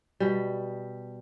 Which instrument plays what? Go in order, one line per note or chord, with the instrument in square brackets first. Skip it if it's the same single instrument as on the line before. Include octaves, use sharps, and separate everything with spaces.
[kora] B2 G3